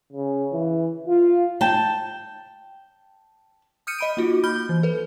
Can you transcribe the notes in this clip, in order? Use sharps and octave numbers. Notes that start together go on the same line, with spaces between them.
C#3
E3
F4
G5 A5
D#6 F6 G6 C#7 D#7
D#5 B5 D7
A#3 D#4 F4 F#4
A#3 B5 F6 G6 G7
E3
A4 B4